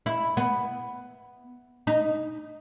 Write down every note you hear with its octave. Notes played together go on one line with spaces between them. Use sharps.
E4
B3
D#4